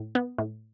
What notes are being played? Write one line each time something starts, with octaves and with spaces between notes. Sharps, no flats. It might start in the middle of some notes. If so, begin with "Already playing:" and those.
Already playing: A2
B3
A2